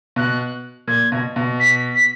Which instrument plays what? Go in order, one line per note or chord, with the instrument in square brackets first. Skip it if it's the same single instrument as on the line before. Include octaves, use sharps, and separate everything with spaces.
[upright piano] B2 [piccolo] F#6
[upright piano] A#2 [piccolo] G#6
[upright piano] B2
B2
[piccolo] B6
B6